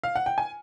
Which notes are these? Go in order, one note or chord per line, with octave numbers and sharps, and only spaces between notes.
F5
F#5
G5
G#5